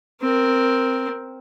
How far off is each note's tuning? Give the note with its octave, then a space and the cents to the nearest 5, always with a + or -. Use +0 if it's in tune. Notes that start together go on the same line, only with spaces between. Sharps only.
C4 +0 A#4 +0